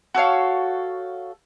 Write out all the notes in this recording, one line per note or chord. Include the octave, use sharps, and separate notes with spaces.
F#4 A4 C#5 F5